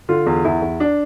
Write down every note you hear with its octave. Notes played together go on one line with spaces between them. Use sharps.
D3 F4
E2
E2 E4
E2
D4